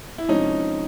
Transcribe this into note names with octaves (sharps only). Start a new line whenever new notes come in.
E4
C3 F3 G#3 C#4 D#4